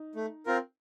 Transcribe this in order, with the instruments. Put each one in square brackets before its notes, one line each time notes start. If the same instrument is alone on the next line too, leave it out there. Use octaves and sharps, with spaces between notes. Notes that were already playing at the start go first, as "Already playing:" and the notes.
Already playing: [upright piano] D#4
[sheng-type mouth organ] A3
C4 F4 A#4